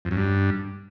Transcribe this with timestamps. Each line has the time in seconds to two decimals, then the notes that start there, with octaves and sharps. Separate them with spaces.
0.05 F2
0.11 F#2
0.17 G2